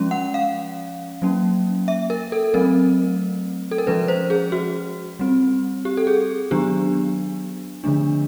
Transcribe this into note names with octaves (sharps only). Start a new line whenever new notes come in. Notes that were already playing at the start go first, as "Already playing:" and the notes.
Already playing: F3 G#3 C#4
F#5
F5
F#3 A#3 C#4
E5
A#4
A4
F#3 A3 C4 A#4
A4
A#4
F3 G#3 C#4 B4
C5
G#4
F#4
G3 C4
G4
A4
G#4
D#3 F#3 B3 D4 G4
D3 F3 A3 D4